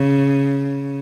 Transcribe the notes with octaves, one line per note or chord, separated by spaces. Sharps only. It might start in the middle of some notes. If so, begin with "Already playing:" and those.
Already playing: C#3